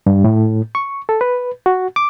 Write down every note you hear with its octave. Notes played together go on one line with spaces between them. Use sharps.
G2
A2
C#6
A4
B4
F#4
D6